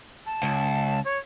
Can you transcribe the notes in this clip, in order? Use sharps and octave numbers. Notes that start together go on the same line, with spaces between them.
A5
C#2
C#5